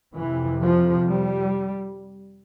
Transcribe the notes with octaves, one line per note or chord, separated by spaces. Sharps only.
F2 C3 E3
F3
G3